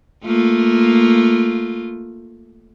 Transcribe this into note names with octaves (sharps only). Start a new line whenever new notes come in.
A3 A#3 F4